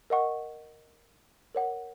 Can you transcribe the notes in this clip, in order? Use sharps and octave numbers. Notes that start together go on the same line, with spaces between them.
A#4 D#5 F#5 C#6
A#4 C#5 F#5